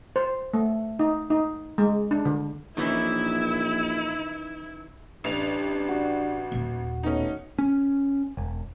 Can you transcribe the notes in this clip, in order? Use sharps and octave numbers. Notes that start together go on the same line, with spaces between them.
C5
A3
D#4
D#4
G#3
D4
D3
A#1 D#3 E3 C#4 D#4 E4
A1 D4 G4 F7
F#4
D#1 D#2
B2 A3 B3 C#4 D#4
C#4
E1